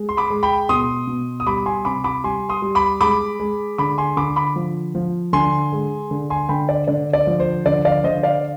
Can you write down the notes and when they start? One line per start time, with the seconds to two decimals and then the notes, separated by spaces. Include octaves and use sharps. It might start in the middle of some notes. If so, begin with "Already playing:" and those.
Already playing: G#3
0.09 C6
0.17 B5 D6
0.30 G#3
0.43 G5 B5
0.69 B2 C6 D#6
1.07 B2
1.40 D#6
1.47 G3 B5 D6
1.66 G#5 C6
1.85 C3 B5 D6
2.04 B5 D6
2.24 G3 G#5 C6
2.49 C6 D#6
2.62 G3
2.75 B5 D6
3.01 G#3 B5 D6
3.40 G#3
3.78 D3 B5 D6
3.98 G#5 C6
4.17 D3 B5 D6
4.36 B5 D6
4.56 F3
4.95 F3
5.33 D3 G#5 C6
5.73 G#3
6.11 D3
6.30 G#5 C6
6.49 D3 G5 B5
6.69 D5
6.88 D3 D5
7.13 D5
7.27 F3
7.40 C5
7.66 D3 D5
7.85 D5 F5
8.04 D3 C5 D#5
8.23 D5 F5